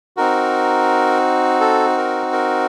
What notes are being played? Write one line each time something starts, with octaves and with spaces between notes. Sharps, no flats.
C4 D#4 F#4 A#4
A4
A#4
A#4